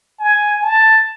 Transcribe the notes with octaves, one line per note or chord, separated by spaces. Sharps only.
G#5
A5